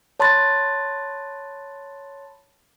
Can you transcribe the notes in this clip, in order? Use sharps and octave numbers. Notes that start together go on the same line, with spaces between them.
C#5 A5 B5 C6 F#6 A6